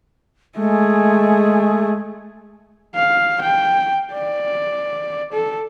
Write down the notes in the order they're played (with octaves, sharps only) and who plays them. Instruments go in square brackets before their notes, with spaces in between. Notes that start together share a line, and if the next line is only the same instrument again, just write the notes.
[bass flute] G#3 [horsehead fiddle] A3 G#4
[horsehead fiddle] F5
G5
D5
A4